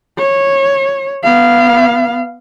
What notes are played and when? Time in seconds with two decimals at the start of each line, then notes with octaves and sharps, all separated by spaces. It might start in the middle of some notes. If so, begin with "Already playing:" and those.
0.18 C#5
1.24 B3 F5